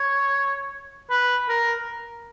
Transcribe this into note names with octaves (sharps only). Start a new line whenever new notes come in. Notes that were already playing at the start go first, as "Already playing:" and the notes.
Already playing: C#5
B4
A#4